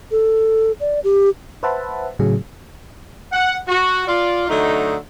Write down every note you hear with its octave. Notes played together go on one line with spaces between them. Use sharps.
A4
D5
G4
B4 C5 E5 F#5 A5 B5
A2 C#3 F#3 G#4
F#5
F#4
F4 D5
D3 F#3 A3 D#4